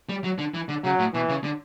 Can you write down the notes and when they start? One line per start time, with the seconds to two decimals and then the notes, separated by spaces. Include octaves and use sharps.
0.09 G3
0.24 F#3
0.38 D3
0.54 E3
0.69 D3
0.84 C#3 F#3
0.99 A2
1.14 B2 E3
1.29 C#3
1.44 D3